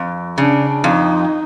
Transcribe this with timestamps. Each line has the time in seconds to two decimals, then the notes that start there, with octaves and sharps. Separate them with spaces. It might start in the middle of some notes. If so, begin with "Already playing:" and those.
Already playing: F2
0.38 C#3 D4
0.84 F2 D#4